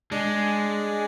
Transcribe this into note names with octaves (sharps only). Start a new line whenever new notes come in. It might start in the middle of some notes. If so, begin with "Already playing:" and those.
G#3 D4